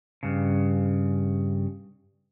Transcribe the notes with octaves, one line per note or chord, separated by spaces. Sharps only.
G2 C#3